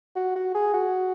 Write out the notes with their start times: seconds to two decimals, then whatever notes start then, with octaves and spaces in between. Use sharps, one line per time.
0.16 F#4
0.35 F#4
0.54 G#4
0.74 F#4